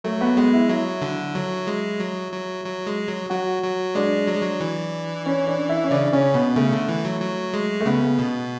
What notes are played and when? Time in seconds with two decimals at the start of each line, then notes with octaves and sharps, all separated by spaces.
0.04 F#3 A3
0.21 B3
0.37 G#3 B3
0.53 E4
0.69 F#3 E4
1.02 D3
1.35 F#3
1.67 G#3
2.00 F#3
2.32 F#3
2.65 F#3
2.87 G#3
3.08 F#3
3.30 F#3 F#4
3.63 F#3
3.95 G#3 D4
4.27 F#3
4.35 G#3
4.42 F#3
4.60 E3
5.26 C#4
5.47 D4
5.69 E4
5.84 C#4
5.91 C#3 D4
6.12 C#3 C#4
6.34 B2 B3
6.56 C#3 A3
6.72 D3
6.89 E3
7.05 F#3
7.21 F#3
7.54 G#3
7.80 A3
7.86 C#3 B3
8.19 B2